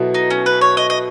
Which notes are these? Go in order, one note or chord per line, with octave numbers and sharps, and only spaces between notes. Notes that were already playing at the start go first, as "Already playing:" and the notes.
Already playing: B2 F#3 B3 E4 A4
D#4
C#4
B4
C#5
D#5
D#5